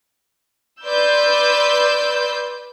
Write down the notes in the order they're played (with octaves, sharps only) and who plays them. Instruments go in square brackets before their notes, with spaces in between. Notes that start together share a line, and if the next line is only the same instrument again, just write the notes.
[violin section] B4 D5 C6 E6 G6